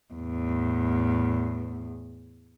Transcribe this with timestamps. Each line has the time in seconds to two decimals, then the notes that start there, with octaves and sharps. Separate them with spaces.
0.14 E2 A2